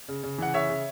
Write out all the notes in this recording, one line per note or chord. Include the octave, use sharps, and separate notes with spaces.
C#3
C#3
E3 F#5
C#3 C#5 E5
C#3